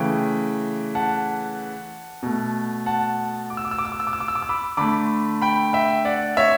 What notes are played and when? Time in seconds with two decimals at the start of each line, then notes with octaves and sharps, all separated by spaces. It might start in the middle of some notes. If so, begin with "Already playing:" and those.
Already playing: C#3 E3 A3 G5
0.95 F#5 A5
2.23 B2 A3
2.86 F#5 A5
3.50 D6
3.57 E6
3.65 D6
3.71 E6
3.78 D6
3.85 E6
3.92 D6
4.00 E6
4.07 D6
4.13 E6
4.20 D6
4.28 E6
4.35 D6
4.42 E6
4.49 B5 D6
4.77 D3 A3 B5 D6
5.42 G5 B5
5.73 E5 G5
6.05 D5 F#5
6.37 C#5 E5